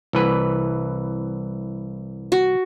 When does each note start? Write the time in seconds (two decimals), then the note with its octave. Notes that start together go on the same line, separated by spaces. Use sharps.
0.13 C2 E3 B4
2.32 F#4